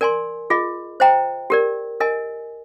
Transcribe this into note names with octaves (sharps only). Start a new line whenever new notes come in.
A#4 D5 G#5 C6
F4 G#4 D#5
C5 D#5 G5 A#5
G4 A#4 D5
A#4 D#5 G#5